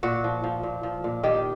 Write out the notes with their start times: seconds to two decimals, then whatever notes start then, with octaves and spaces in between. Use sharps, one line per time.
0.03 A#2 F#4
0.24 F3
0.44 F3
0.63 A#2
0.83 F3
1.04 A#2
1.23 D#3 G4